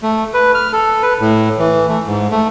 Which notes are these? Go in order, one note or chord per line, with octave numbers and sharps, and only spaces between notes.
A3
B4
F6
A4
B4
A2
E3
A3
G#2
A3